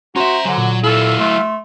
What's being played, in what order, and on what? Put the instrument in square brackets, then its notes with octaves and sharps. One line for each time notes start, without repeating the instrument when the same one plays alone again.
[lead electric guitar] C#4 E5 [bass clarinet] F#4 [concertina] C5 A#5 [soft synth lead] C6
[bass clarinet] D3 [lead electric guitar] F#3 [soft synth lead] G#5
[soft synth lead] A#2
[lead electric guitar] F#3 E4 [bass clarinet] A4 [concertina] E5 F5
[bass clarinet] A3 [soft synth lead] C6